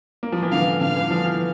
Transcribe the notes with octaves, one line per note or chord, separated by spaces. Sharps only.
A#3
F3
E3
D3 F5
D3 F5
E3
F3
E3